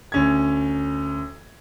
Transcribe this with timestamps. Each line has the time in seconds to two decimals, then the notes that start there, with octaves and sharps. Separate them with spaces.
0.12 D2 C#4 G#6